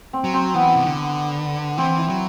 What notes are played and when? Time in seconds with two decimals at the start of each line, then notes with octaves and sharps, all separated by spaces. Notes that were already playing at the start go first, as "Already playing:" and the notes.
0.13 C4
0.24 F#3
0.33 C4
0.54 E3 B3
0.76 C3
0.86 D3
1.78 E3 C4
1.98 E4
2.09 F#3